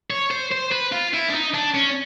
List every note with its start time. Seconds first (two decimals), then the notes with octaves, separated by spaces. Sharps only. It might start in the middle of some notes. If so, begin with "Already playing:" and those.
0.10 C#5
0.31 C5
0.51 C5
0.72 B4
0.92 F4
1.13 E4
1.30 D4
1.34 D#4
1.54 D4
1.74 C#4